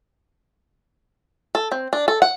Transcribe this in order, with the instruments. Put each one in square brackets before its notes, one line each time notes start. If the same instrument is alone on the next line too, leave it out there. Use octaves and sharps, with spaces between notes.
[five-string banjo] A4
C4
D4
A4
F#5